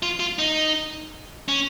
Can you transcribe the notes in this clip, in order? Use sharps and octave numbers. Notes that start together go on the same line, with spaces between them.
F4
F4
D#4
C#4